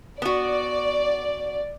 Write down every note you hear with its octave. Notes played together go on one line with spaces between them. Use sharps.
B3 F#4 D5